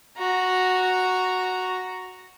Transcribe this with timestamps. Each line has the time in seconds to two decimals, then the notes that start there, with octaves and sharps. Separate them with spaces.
0.18 F#4 A#5